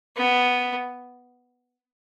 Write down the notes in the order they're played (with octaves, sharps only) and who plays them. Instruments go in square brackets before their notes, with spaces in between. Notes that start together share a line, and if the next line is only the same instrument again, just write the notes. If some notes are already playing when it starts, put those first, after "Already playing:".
[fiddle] B3